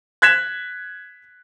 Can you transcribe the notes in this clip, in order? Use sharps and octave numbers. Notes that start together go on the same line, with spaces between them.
F#6 G#6 B6 E7